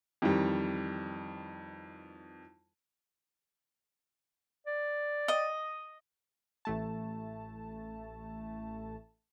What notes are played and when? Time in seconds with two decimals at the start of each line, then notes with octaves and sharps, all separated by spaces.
0.22 F2 D#3 E3 G3
4.67 D5
5.28 D#5
6.65 A1 A3 A5